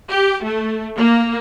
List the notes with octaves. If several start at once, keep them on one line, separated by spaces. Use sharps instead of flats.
G4
A3
A#3